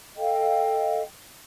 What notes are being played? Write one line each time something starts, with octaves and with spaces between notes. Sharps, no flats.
A4 D#5 F5 G5